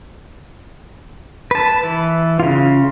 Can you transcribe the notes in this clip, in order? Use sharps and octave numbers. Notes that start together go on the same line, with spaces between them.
B4 A5
E3
C#3 F4